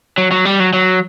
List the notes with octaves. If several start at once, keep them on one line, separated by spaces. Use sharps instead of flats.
F#3
F#3
G3
F#3
F#3